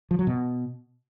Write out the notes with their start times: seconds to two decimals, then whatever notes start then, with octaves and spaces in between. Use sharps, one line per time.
0.11 F3
0.19 F#3
0.27 B2